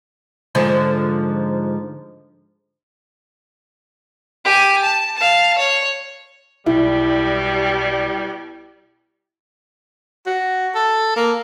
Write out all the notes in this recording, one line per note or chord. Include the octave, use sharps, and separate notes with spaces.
G#2 D3 F3
G4 G#5
A5
F5 A5
C#5
B1 B2 G3 E4
F#4
A4
A#3